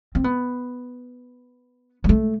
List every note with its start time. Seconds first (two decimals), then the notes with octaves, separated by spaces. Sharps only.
0.15 C4
0.24 B3
2.04 G3
2.09 A3